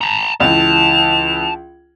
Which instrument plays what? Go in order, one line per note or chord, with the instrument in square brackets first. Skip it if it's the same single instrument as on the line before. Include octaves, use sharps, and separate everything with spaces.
[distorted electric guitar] A5 A#5
[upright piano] C#2 E3 [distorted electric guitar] A5 [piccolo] F7